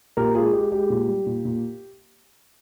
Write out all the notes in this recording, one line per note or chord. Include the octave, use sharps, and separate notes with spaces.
A#2 G4 A#4
G#3 F4 G#4
G#3 G4
G#3 G4
A#2
G3
A#2
A#2